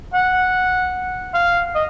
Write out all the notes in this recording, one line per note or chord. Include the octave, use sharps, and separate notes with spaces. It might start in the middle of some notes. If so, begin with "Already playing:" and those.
F#5
F5
D#5